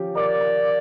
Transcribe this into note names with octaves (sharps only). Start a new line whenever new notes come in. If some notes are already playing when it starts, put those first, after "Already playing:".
Already playing: F3 C#4 G4
A#4 D5
A#4